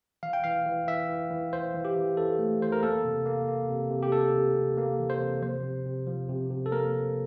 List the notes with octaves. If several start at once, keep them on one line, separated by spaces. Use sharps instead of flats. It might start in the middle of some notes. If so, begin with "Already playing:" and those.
E3 F5
G5
E3 F5
E3
E3 E5
E3
E3
E3 C5
E3
G4
E3
E3 A4
A3
E3 C5
A#4
A#3 A4
C3
A#3
A#3
C3
C3
G4
C3 A4
C3
C3
A#3
E3
C5
C3
F3 C5
C3
C3
F3
C3
C3
A4
A#3 A#4
C3